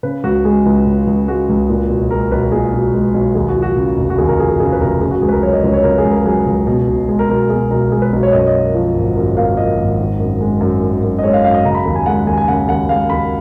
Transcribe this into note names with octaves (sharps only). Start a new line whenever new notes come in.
C#3 B4
C#2 F#4
G#3 G#4
C#2
C#3
C#2
G#3 F#4
C#2
A#2
B1
G#3 A#4
B1 B4
A#2 G#4
B1
G#3
B1
D#2 G#4
F#4
F3
F#4
C#3
F1
F#4
D#2 G#4
A#4
F3 G#4
G#4
C#3 G#4
B4
F1 A#4
C#3 G#4
F#4
C#2 G#4
B4
A#4
F#3 C#5
D#5
C#2 C#5
C#5
C#3 A#4
G#4
C#2
A#4
F#3 G#4
C#2
B2
B1
G#3 G#4
A#4
B1 A#4
B2 G#4
B1 A#4
G#3 G#4
B4
B1
C#5
F#2 D#5
C#5
D#5
A#3
F3
G#1
F#2
A#3 F5
F3 D#5
G#1
D#3
F#2
G#3
F#2
D#3
F#2
D#5
G#3 C#5
F5
F#2 F5
D#5
C#3 A#5
B5
D#2
G#5
G#3 F#5
F#5
D#2 G#5
G#5
C#3 F#5
G#5
D#2 F#5
G#3 F5
D#2 B5